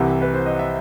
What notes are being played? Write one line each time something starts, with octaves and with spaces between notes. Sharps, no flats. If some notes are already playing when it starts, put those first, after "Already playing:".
Already playing: C2 C3 E3 F#5
B4
C5
D#5
E5